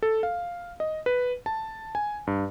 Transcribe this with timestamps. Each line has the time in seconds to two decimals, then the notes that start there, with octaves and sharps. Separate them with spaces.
0.02 A4
0.23 F5
0.80 D#5
1.06 B4
1.46 A5
1.95 G#5
2.27 G2